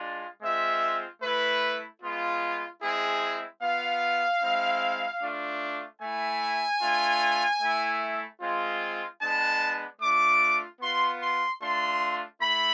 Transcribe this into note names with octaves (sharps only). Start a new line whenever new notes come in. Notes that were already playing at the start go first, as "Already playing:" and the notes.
Already playing: G#3 D4 F4
G#3 C4 F4 E5
A3 E4 B4
G#3 B3 F4
G#3 C4 E4 G#4
B3 F4 F5
G#3 C4 E4
A3 D4 F4
A3 E4 G#5
A3 D4 F4
A3 E4
G#3 C4 F4
G#3 B3 D4 A5
A3 D4 F4 D6
B3 F4 C6
C6
A3 D4 F4 C6
A3 E4 B5